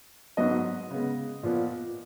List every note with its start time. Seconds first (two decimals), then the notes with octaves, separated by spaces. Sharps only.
0.37 G#2 F#3 B3 D#5
0.91 C#3 G#3 B3
1.43 A#2 F3 B3